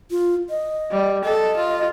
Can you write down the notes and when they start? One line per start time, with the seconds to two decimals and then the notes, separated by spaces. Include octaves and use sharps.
0.11 F4
0.50 D#5
0.91 G3
1.24 A4 D#5
1.57 F4